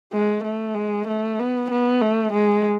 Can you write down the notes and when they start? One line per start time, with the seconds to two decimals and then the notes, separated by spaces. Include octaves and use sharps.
0.13 G#3
0.44 A3
0.75 G#3
1.08 A3
1.39 B3
1.70 B3
2.01 A3
2.33 G#3